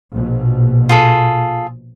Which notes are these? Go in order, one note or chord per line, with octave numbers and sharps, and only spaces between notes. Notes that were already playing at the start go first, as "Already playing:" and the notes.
A#1 B2
F4 G#4 A4